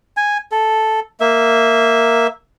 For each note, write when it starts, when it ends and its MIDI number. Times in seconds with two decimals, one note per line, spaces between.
0.17 0.38 80
0.52 1.00 69
1.20 2.27 58
1.20 2.27 76